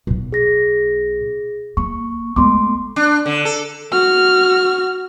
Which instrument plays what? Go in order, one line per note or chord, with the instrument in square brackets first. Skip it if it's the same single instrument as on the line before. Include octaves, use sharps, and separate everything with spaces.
[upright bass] B1 B2
[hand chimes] G#4 A#6
[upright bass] A#3 [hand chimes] C#6
[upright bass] G#3 B3 [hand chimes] A3 C6 D6
[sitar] D4
D3
A4
[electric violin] F#4 F6